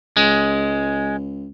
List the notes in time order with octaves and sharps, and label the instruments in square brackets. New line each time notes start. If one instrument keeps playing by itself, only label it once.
[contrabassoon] C#2 [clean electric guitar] G#3